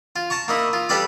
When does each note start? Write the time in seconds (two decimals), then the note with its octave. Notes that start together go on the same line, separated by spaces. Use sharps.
0.16 F4
0.30 A5 A#5 C#6
0.48 A#3 D#4 E4
0.73 F4
0.89 G3 A4 B4 D5 F5 D6